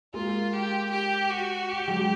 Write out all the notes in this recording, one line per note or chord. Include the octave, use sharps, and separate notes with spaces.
G#3 A#3 F4
G4
G4
F#4
G4
F#3 G#3